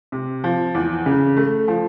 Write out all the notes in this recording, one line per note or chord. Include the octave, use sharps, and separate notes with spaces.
C3
F3
E2
C#3
A3
F3